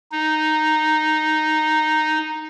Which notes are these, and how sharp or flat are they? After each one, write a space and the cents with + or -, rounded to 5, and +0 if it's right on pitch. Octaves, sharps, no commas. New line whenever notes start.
D#4 -5